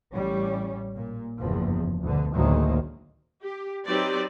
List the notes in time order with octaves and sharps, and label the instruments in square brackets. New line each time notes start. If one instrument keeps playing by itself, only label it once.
[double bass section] A1 G3 C#4
A#2
F#1 E2 G2 F3
D2 B2 D3
A1 D2 D#3 F#3 G#3 A#3
[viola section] G4
F#3 C4 D#4 G4 B4 D5